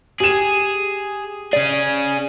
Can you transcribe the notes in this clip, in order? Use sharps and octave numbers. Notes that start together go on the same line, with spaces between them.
G4 G#4 E7
C#4 G#4 D5